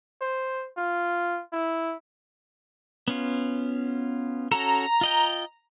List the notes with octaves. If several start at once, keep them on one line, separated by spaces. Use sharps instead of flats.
C5
F4
E4
B3 C#4 F4
C#4 F#4 A4 A#5
F4 D#5 G5